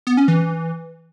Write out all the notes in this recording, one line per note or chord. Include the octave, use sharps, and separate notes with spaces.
B3
C#4
E3